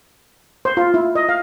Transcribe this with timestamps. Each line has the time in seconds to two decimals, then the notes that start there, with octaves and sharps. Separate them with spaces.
0.65 C5
0.77 F4
0.94 E4
1.16 D#5
1.29 F5